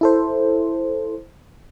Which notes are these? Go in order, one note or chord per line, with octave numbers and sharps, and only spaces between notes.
E4 A4 C5